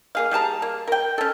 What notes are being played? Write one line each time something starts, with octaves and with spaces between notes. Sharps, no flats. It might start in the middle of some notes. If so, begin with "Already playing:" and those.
A#3 G#4 F5
G3 G#4 A5 A#5
A#3
A#4 G5
C#4 A4